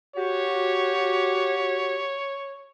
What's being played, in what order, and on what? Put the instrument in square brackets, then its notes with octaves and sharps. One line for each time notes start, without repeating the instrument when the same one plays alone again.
[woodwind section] F#4 G4 [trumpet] C#5